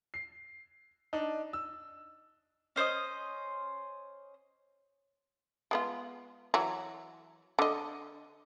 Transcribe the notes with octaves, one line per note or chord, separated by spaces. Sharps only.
C7
D4 D#4
E6
C#4 C5 C#5 D#5
G#3 B3 F4
E3 F#3
D3 D#5